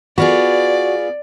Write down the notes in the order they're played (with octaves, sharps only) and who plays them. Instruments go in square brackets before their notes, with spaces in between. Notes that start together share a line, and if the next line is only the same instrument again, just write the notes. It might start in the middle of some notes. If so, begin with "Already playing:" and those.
[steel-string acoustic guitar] B3 F4 G#4 [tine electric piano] F#4 [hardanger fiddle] D5